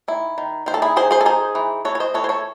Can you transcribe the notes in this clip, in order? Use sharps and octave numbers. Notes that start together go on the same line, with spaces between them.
D#3 E4
D#3
D#3 C5
A4
E4 G#4
D#3 G#4 C5
G#4 C5
A4
D#4 G#4 C5
E3
E3 A4 C#5
C#5
C5 D#5
E3 A4 C#5
C5
A4 C#5